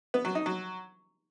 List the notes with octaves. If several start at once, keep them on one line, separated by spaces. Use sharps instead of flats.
B3
F#3
D#4
F#3